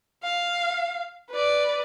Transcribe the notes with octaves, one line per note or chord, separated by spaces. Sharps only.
F5
B4 D5